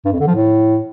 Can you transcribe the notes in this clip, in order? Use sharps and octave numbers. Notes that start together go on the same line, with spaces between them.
G2
F2
D3
F3
A2